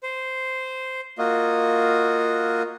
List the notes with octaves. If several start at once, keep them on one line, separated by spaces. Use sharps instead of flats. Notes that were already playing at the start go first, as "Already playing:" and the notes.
C5
A#3 F4 F#4 D#5